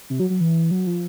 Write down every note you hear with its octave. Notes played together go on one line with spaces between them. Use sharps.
C3
F#3
F#3
E3
F#3
F3